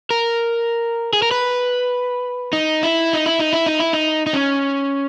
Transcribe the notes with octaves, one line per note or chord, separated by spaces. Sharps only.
A#4
G#4
A#4
B4
D#4
E4
D#4
E4
D#4
E4
D#4
E4
D#4
D#4
C#4